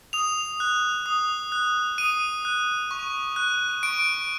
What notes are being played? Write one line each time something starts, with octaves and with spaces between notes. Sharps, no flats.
D#6 F7
F#6
D#6
F#6
D#6 D#7
F#6
C#6
F#6
C#6 D7